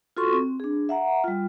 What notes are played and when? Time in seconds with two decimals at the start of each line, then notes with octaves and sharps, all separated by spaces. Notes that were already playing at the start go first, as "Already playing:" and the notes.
0.17 F4 F#4 A4 C6 C#6
0.33 C4
0.60 D4 G#4
0.89 E5 F#5 A#5
1.24 G3 F4